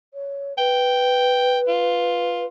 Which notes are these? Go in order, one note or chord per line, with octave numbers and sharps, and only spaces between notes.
C#5
B4 G5
F4